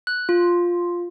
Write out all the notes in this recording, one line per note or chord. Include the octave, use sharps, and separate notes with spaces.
F#6
F4